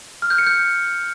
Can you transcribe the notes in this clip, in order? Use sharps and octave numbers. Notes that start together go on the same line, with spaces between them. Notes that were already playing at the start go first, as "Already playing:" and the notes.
F6
G6
C#7
G6